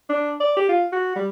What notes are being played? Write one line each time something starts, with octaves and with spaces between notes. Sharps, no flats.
D4
D5
G4
F4
F#4
G3